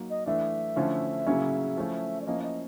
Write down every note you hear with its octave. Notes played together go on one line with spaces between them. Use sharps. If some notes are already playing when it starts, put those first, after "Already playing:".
Already playing: F#3 A#3 D#4
D#5
E3 A3 D4 E5
D3 F3 A3 C#4 E4
C#3 F#3 A#3 C#4 E4
F3 A3 C#4 E4
D5
F3 A#3 C#4 E4 D#5
D#5